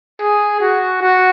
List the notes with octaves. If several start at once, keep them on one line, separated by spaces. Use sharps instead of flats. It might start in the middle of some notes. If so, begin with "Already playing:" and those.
G#4
F#4
F#4